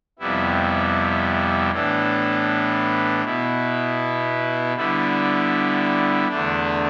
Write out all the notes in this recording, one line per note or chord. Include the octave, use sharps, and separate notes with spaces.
F2 C3 G3 B3 E4
A2 E3 B3 D4
B2 B3 E4
D3 G3 B3 E4
E2 D3 A3 D4